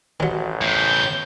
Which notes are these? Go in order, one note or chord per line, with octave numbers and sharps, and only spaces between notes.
A1 D#3 F#3
E2 A2 G6